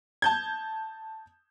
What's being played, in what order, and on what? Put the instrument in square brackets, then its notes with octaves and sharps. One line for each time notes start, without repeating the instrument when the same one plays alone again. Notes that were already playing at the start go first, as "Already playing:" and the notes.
[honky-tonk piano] A5 G6 G#6